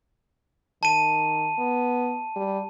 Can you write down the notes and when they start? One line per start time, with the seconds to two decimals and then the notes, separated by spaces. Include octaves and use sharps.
0.83 D#3 A5 D#7
1.58 B3
2.36 G3